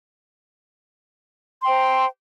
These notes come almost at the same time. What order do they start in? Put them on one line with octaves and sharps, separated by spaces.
C6 G5 C5 A#5